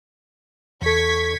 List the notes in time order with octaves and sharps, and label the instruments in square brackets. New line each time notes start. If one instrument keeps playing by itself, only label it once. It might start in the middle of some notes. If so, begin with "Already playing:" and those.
[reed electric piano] E2 A4 [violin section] C#6 G#6 B6